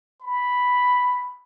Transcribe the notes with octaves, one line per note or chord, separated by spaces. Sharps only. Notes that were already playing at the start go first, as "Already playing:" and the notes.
B5